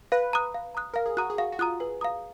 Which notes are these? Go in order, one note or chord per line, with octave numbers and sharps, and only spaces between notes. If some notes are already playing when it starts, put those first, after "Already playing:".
B4 F5
A#5 D#6 F#6
F5
A#5 D#6 F#6
A#4 F5
G#4
F#4 A#5 D#6 F#6
G#4
F#4 F5
F#4
F4 A#5 D#6 F#6
G#4 B4
F5 A#5 D#6